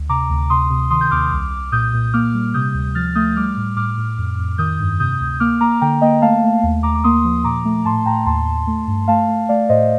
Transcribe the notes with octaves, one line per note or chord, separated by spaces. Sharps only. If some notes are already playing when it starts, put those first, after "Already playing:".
Already playing: D2
C3 A#5 D6
D2
C3 C6 D#6
C3
D#3 C6 D#6
G6
D#2 D6 F6
C2
C2
A#2 D#6 G6
A#2
A#3 D6 F6
G3
C3 D#6 G6
D2
F3 F6 A6
A3 D#6 G6
G3 D6 F6
A2
A2 D6 F6
A2
F2
F2
D#3 D#6 G6
G2
C3 D#6 G6
D2
A#3 D6 F6
A#3 A#5 D6
D3 G5 A#5
A#3 D#5 G5
A3 F5 A5
A3
D#2
D#2 A#5 D6
D6
A#3 C6 D#6
F3
A#2 A#5 D6
A3
A2 A5 C6
A2 G5 A#5
D#2 A5 C6
D#2
A3
G2
A3 F5 A5
A3
A3 D5 F5
A2 C5 D#5